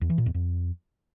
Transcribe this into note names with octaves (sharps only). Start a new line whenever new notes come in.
E2
E3
A#2
E2
F2